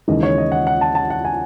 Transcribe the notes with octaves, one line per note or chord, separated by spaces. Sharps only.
D#2 C#3 E3 G#3 D#5
C#5
D#5
F#5
F#5
A5
A5
F#5
G#5